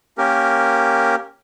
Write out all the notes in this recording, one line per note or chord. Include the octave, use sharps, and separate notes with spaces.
A#3 C#4 G4 A#4